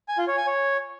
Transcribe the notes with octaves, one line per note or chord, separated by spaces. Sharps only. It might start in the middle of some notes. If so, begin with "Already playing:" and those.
G#5
F4
C#5
G#5
C#5